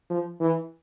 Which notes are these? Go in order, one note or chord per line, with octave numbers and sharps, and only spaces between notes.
F3
E3